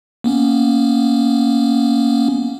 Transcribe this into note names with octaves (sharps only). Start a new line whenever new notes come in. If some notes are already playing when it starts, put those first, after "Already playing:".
A#3 B3 C#4